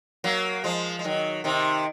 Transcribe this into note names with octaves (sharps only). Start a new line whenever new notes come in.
F#3 A#3
F3 G#3
G#3
D#3 F#3
C3 D#3